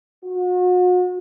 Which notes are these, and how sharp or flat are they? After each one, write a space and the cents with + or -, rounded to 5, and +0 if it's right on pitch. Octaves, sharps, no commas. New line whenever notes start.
F#4 -40